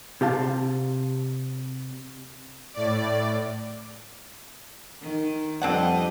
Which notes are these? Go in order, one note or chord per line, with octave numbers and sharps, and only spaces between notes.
C3 G4 F5 A5
A2 D5
D#3
F2 G3 C4 D4 D#5 F#5